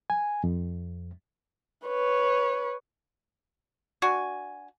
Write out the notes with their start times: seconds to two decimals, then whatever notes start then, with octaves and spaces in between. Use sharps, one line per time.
0.10 G#5
0.44 F2
1.86 B4 C#5
4.02 D4 F#4 G#5